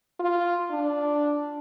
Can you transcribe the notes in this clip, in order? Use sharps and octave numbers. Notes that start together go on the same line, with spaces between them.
F4
D4